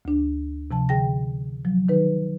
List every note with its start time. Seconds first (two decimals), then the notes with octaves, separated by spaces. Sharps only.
0.05 D2 D4
0.71 C3 F3 A5
0.89 D3 G#4 G5 A#6
1.65 F3 F#3
1.88 D#3 D#4 B4